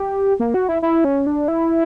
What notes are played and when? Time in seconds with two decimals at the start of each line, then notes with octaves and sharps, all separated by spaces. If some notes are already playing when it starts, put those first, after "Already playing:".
Already playing: G4
0.40 A#3
0.54 F#4
0.69 E4
0.82 E4
1.04 C#4
1.27 D4
1.48 E4